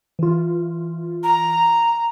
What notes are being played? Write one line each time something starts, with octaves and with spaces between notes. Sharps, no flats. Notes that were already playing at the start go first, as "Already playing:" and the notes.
E3 F4
A#5